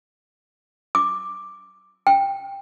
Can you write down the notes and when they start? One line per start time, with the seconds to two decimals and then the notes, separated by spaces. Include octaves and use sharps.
0.95 D6
2.07 G5